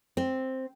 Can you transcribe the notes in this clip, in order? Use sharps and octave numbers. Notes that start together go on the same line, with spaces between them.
C4